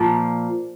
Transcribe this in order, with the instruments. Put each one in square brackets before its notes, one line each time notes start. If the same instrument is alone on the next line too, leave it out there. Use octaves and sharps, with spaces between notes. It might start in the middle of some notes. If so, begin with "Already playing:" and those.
Already playing: [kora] A#2 F3 A#3